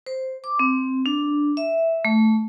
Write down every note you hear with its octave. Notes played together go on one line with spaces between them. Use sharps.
C5
D6
C4
D4
E5
A3